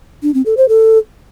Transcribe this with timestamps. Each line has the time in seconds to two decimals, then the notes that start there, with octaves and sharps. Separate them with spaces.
0.23 D4
0.34 C4
0.46 A4
0.57 C5
0.69 A4